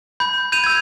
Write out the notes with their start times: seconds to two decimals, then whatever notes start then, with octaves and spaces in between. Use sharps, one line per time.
0.20 B5 G6
0.52 G6 D#7 F7
0.64 E6 G#6